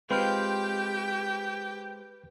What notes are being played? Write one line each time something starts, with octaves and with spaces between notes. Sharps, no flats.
G#3 C4 F4 G4 B4 G5 B5 F6